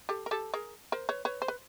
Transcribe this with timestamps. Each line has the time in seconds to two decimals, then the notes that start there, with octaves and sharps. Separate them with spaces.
0.09 G4 A4
0.26 A#4
0.31 G4 A4
0.54 G#4 A#4
0.92 A#4 C5
1.09 B4 C#5
1.25 B4 C#5
1.42 C5
1.48 B4